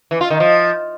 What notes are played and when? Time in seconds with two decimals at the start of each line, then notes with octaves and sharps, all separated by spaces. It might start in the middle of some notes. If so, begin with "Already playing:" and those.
0.11 E3
0.21 F4
0.30 D#3
0.40 F3